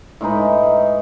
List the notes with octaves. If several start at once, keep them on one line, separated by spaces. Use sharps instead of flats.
A2 G#3 D#4 B4